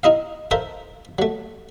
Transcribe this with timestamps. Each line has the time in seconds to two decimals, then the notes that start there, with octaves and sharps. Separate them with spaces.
0.03 D#4 E4 D#5 F5
0.51 A4 A#4 C5 E5 F5 A5
1.19 F#3 A3